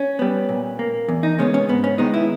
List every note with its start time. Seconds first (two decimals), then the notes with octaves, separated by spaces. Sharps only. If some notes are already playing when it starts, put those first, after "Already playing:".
Already playing: C#4
0.19 G3 B3
0.49 A#2
0.79 A#3
1.08 E2
1.23 D#4
1.39 C#3 G#3 B3 C#4
1.54 C#4
1.69 G#2 B3
1.84 C#4
1.98 D#3 G#3 B3 D#4
2.14 E4